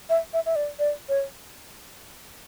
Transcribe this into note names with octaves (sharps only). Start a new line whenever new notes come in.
E5
E5
E5
D5
D5
C#5